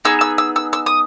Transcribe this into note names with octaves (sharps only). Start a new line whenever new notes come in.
B3 D#4 G#4 E6
E6
E6
E6
E6
D#6